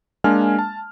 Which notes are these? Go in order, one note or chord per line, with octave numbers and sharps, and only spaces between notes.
G#3 A#3 D4 G#5 F6
A5